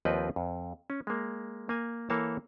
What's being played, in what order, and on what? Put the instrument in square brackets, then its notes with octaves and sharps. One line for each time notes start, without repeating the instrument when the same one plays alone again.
[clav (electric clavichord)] D#2 F3 C4 B4 D5 D#5
F2
C#4
G#3 A#3
A#3 G#5
E3 A#3 A4 C#5 A5